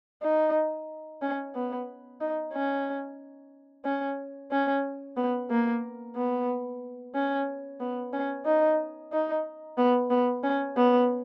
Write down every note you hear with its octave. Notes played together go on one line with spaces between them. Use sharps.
D#4
C#4
B3
D#4
C#4
C#4
C#4
B3
A#3
B3
C#4
B3
C#4
D#4
D#4
B3
B3
C#4
B3